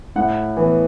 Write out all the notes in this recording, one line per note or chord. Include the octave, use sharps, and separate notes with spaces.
A2 F#5
E3 B3